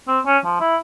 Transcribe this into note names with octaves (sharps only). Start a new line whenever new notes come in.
C4
C#4
F3
E4